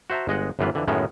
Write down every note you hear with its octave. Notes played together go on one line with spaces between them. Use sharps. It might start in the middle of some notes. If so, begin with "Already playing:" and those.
F#4 C5 E5 A5 A#5
G1 G#3 D#5 F#5
G1 F#2 D3 E3 F4 B4
F2 D3 E3
F#2 A2 D#3 G#3 B3 C#4